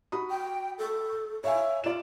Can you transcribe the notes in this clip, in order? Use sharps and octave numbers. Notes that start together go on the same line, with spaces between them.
F#4 B5 D#6
G5
A4
C#5 E5 F5 G#5
F4 D5 E7